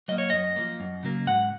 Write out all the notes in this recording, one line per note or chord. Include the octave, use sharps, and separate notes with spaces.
F#3 A#3 D#5
C#5
F#2 D#5
F3 A#3
F#2
C#3 F#3 A#3
G#2 F#5